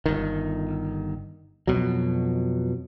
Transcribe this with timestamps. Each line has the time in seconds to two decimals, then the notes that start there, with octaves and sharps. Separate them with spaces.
0.06 G1 D#3
1.67 F2 B2 F#3